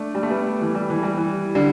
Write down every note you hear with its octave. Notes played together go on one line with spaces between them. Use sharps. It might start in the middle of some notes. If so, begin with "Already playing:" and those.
Already playing: A3 D4
G3
A3
G3 B3
E3
G3
E3
G3
E3
D3 G3